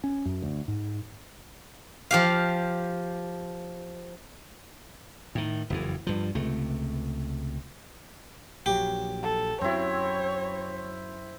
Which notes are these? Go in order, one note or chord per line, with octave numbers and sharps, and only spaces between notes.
C#4
F#2
D2
G#2
F3 G4 F5
A2 D#3
F#1 F2 E3
G2 F3
C#2 C3 A3
A#1 F#3 G4
A4
F#2 F#3 C4 E4 C#5